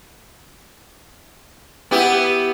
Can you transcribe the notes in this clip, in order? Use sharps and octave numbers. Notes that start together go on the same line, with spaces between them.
B3 E4 G4